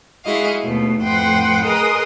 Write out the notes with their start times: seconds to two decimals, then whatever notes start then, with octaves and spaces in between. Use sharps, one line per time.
0.25 G#3 E4 F#4 G#4 D#5 F5
0.60 D#2 B2 A3
1.03 F2 A2 B4 F#5 G5 C6
1.65 G#4 A#4 B4 D#5 C6 D#6